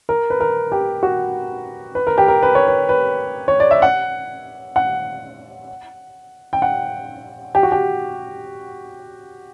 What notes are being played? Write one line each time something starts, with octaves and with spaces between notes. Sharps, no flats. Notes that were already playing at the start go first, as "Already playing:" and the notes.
A#4
B4
A#4
G4
F#4
B4
A#4
G4
A#4
B4
C#5
B4
B4
C#5
D5
E5
F#5
F#5
G5
F#5
G4
F#4
G4